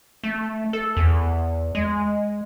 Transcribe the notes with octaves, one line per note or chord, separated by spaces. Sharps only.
A3
A4
E2
G#3